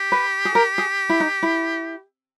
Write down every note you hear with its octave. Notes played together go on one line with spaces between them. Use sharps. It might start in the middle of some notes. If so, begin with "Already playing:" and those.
Already playing: G4
B4
G#4
A#4
G#4
E4
D#4
E4